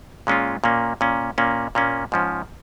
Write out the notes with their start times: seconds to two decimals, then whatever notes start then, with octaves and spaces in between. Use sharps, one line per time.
0.27 A#2 G#3 C#4 F4
0.64 A#2 A#3 C#4
1.01 A#2 A#3 C#4
1.38 A#2 A#3 C#4
1.75 A#2 A#3 C#4
2.12 G#2 F3 C#4